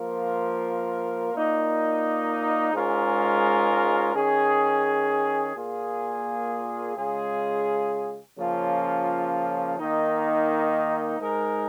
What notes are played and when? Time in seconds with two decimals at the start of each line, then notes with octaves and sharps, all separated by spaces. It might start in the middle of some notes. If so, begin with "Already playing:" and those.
Already playing: F3 A#3 F4 A#4
1.32 A#2 A#3 D#4
2.74 G#2 G#3 C#4 F4 A#4
4.14 D#3 C#4 G#4
5.56 A#2 A#3 F4 G#4
6.96 C#3 G#3 F4 G#4
8.37 C#3 F3 A#3 C#4 F4
9.78 D#3 A#3 D#4
11.19 G#2 G#3 D#4 A#4